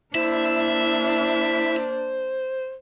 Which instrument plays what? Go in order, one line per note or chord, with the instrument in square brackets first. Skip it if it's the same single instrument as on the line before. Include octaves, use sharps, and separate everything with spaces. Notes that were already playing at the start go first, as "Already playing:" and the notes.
[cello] A#3 D4 [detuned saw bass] E4 [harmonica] C5 [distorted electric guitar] E5